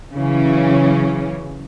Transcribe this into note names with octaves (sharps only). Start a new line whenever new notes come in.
C#3 E3 F#3 C#4